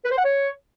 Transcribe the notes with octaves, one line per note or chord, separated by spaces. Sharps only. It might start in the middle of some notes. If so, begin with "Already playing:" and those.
B4
C5
F#5
C#5